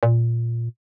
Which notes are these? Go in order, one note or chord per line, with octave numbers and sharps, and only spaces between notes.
A#2